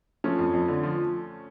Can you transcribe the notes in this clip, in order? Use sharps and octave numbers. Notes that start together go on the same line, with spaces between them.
F3 A3 C#4
F2
F2
D3
F3